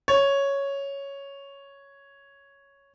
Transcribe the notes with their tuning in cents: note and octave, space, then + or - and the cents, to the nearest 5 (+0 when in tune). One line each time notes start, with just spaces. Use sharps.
C#5 +0